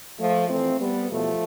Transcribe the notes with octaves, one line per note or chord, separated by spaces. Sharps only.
F3 A3
F2 E3 A3 C4
G3 B3
E2 B2 F3 A3